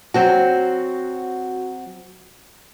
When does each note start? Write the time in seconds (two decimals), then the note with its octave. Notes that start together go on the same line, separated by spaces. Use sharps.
0.14 F#3 C4 F#4